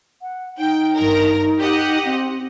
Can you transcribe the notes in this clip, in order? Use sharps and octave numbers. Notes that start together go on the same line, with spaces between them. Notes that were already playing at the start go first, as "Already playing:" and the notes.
F#5
D#4 G5
G2 A#4
G4 D#5 F#5
C4